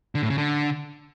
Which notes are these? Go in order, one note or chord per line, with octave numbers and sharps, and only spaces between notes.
D3
A2
C#3
D3